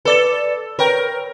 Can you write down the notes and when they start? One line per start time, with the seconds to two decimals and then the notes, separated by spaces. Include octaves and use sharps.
0.05 A4 B4 D5 A6
0.79 A#4 B4 C#5 G5